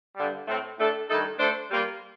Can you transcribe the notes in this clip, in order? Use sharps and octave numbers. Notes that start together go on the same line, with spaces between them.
G2 D3 G3
A2 A3 C4
A2 A3 D4 A4
G2 D#3 A3 D#4 A4
A3 D4 A4 C5
G3 A#3 F4